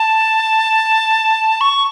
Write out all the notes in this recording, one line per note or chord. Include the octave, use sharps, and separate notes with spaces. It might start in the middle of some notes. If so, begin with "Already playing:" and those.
Already playing: A5
C#6